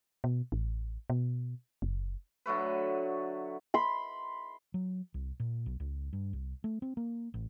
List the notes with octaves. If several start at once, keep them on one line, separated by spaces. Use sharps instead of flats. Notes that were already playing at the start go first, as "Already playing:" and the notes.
B2
A1
B2
F#1
D3 F#3 A3 B4
B5 C6
F#3
C2
A#2
B1
C#2
G2
C2
A3
C4
A#3
A1